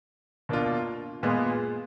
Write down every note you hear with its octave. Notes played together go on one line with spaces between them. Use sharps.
B2 A#3 D4 F4
A#2 G#3 B3 F4